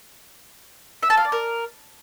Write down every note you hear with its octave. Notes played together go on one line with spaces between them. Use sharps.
E5
A5
F5
D5
A#4